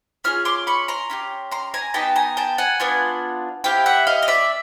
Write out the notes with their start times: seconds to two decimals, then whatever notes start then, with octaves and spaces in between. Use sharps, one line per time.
0.24 C#4 F4 G#4 F6
0.45 C6 D6
0.67 B5 C#6
0.88 A#5 C6
1.10 C#4 E4 G4
1.52 A#5 C6
1.74 G#5 A#5
1.94 B3 D#4 G4 G5 A5
2.16 G#5 A#5
2.37 G5 A5
2.58 F#5 G#5
2.80 B3 D4 F4
3.64 C4 E4 G4 F5 G5
3.86 E5 F#5
4.07 D#5 F5
4.23 D#5
4.28 D5 E5